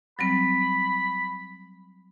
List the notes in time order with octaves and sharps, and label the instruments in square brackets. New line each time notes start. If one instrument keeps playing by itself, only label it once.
[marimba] F#3 G3 C4 [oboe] B5